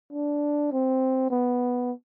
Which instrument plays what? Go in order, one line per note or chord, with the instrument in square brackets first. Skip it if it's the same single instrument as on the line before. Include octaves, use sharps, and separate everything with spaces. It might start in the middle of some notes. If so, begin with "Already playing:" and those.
[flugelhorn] D4
C4
B3